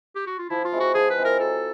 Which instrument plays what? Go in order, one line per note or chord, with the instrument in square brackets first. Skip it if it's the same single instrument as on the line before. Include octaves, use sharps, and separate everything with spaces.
[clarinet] G4
F#4
F4
[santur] F3 [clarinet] E4
[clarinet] F4
[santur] G#3 C4 E4
[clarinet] F#4
[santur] F3 [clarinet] G#4
[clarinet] B4
[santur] G#3 C4 E4
[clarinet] A#4
[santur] F#3 [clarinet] A4